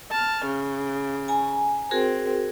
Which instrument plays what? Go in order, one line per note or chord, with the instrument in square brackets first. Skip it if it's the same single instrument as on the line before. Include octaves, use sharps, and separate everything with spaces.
[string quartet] A5 F6
C#3
[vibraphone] G#5 A#5
[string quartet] C4 [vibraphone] F#4 G#4 A#4